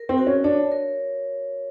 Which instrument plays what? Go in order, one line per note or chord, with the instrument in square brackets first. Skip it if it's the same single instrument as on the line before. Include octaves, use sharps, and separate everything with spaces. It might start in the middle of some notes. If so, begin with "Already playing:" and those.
Already playing: [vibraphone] A#4
[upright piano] C4
[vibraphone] F#4
[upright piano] C#4
[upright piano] D4 [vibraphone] C#5
[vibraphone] A#4